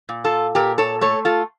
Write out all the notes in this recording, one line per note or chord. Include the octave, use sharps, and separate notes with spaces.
A#2
F4 A4
A#2 G4 A#4
A4 C#5
A3 A4 C#5
F4 A4